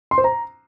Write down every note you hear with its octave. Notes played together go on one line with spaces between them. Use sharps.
C6
C5
A#5